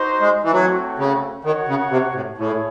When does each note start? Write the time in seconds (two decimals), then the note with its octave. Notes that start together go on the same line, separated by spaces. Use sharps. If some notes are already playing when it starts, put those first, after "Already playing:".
Already playing: D#4 F#4 C5
0.21 G#3
0.43 E3
0.52 F#3 A3 C4 F#4 A4 C#5
0.99 C#3
1.45 D#3 F#5
1.47 F#4 C#5
1.68 C#3
1.91 C3
2.14 A2
2.38 A2 E4 G#4 C#5